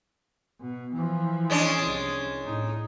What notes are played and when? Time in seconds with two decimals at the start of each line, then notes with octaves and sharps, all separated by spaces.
0.61 B2
0.94 E3 F3
1.50 G#3 C#4 D4
1.82 C2
2.45 A2 D#4